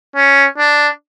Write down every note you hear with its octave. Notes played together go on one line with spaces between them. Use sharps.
C#4
D4